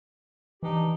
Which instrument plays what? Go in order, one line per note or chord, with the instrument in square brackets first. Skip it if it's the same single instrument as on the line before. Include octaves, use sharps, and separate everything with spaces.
[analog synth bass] E3 [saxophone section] D4 D#4 G4